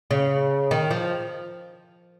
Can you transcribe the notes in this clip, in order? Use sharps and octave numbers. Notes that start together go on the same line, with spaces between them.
C#3
D#3
F3